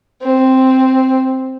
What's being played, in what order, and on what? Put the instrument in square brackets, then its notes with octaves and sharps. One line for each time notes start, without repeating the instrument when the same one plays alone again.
[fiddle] C4